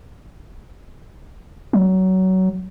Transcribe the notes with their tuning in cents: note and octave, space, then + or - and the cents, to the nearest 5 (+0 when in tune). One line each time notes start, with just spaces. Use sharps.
F#3 +20